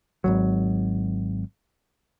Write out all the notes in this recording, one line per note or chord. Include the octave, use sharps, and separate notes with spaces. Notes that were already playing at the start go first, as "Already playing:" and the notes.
G#1 C#2 F#3